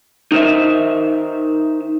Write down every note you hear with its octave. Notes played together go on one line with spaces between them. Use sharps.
D#4 A#4 C5 E5